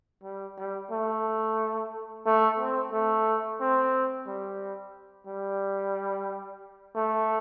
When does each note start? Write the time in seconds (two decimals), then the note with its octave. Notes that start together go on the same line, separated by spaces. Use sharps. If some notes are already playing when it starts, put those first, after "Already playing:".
0.24 G3
0.58 G3
0.91 A3
2.26 A3
2.59 C4
2.92 A3
3.60 C4
4.26 G3
5.27 G3
6.95 A3